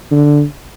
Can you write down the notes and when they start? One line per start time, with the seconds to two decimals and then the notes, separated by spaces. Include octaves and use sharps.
0.11 D3